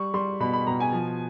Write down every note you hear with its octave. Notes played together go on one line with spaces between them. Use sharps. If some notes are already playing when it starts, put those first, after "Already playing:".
Already playing: G3 C#6
G3 C6
B2 B5
B5
B2 A#5
G#5
F3